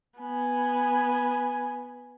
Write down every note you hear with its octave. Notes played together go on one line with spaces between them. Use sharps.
B3 G#5